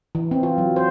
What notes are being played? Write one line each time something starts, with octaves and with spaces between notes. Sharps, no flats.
E3
C4
F4
F#3
C5